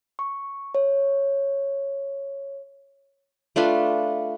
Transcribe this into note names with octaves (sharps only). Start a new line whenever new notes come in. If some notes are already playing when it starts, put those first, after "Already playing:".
C#6
C#5
A3 D4 F4 B4